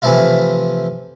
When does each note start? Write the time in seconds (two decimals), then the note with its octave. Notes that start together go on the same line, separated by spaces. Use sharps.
0.02 C3 E3 F3 A3 E4 F4